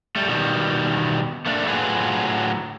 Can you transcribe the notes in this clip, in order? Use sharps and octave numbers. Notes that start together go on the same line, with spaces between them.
G3 A3
B2 D#3 G3
A3 A#3 D4
A2 D3 F#3 F4 G#4 B4